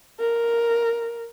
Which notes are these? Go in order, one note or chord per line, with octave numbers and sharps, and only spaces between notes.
A#4